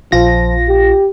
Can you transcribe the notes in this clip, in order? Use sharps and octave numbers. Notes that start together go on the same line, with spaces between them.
A#1 F3 F4 A#6
G4